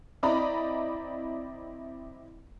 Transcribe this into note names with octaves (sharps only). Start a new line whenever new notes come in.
C4 E4 D5 D#5 A#5 B5